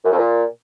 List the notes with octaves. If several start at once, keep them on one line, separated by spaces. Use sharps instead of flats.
F#2
F2
A#2